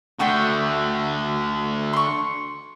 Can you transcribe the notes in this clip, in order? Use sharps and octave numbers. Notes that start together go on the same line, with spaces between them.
D3 A3 F#4 G5 C6
C6 C#6